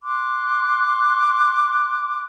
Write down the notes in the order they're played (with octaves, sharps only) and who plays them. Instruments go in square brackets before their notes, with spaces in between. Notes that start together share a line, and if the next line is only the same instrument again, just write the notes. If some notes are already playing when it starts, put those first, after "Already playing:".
[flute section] C6 D6 F#6